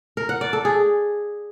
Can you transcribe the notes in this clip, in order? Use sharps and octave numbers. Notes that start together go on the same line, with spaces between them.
A#4
F#5
D5
A4
G#4